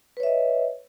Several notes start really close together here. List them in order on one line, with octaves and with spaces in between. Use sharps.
B4 C#5 E5 D#5